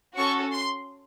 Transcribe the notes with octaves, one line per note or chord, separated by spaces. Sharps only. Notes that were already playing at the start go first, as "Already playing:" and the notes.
C#4 F#4 A4 C#6
C6